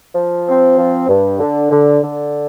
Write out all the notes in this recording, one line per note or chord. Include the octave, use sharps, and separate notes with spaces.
F3
C4
F3
G2
D3
D3
D3